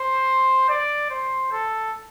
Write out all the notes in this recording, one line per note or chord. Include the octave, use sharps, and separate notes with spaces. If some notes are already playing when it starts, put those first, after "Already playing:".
Already playing: C5
D5
C5
A4